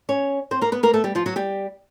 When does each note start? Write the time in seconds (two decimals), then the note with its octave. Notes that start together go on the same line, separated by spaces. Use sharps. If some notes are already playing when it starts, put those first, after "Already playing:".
0.09 C#4 C#5
0.51 C4 C5
0.61 A#3 A#4
0.72 B3 B4
0.83 A#3 A#4
0.93 A3 A4
1.04 G3 G4
1.15 F3 F4
1.26 F#3 F#4
1.36 G3 G4